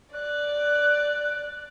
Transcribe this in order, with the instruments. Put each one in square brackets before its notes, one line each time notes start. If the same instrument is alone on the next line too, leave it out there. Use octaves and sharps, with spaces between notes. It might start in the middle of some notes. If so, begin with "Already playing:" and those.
[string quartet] D5 [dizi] F#6